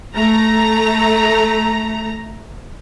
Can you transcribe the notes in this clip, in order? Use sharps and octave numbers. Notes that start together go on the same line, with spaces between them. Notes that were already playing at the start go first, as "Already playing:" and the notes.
A3 A#5